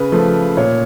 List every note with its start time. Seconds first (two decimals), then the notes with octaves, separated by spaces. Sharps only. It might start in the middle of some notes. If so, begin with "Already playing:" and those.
Already playing: C#3 B4
0.12 F3 A3
0.57 A#2 C#5